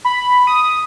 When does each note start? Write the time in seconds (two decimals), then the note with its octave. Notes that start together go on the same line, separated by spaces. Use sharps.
0.05 B5
0.47 D#6